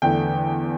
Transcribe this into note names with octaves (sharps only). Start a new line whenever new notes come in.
E2 D3 A3 G5